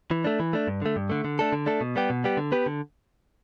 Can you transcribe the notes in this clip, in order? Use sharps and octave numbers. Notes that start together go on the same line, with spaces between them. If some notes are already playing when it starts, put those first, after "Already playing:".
E3
A3 D4
E3
A3 D4
G2
D3 A3
G2
D3 A3
D3
A3 D4 A4
D3
A3 D4 A4
B2
G3 B3 G4
B2
G3 B3 G4
D3
B3 G4 B4
D3